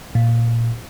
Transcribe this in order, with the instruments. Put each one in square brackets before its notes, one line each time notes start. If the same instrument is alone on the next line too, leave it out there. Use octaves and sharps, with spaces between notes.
[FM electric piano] A#2